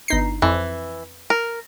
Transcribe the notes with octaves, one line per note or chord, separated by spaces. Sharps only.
G1 D#4 C7
F2 E3
A#4